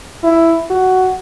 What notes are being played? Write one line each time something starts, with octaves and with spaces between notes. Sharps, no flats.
E4
F#4